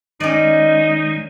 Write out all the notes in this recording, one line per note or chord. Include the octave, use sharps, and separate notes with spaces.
D#3 G#3 C#4 D#4 D5 D#5